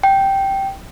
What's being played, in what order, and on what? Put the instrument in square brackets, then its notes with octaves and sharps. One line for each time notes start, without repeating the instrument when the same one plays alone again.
[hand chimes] G5